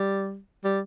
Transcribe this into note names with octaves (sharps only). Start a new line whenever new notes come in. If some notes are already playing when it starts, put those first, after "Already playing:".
Already playing: G3
G3